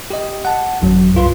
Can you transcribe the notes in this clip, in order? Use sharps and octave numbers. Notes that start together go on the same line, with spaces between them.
G4 D#5
F#5 A5
G#1 F#2 F#3
C2 G2 F4 B4 C6